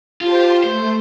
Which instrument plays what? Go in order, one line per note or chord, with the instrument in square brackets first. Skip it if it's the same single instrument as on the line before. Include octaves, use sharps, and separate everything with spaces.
[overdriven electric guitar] F4 [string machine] G4 C5 A5
[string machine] A3 [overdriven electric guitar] C5